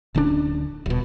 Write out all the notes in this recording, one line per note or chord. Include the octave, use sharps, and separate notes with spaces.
D1 D3 C#4 D4
D#1 B2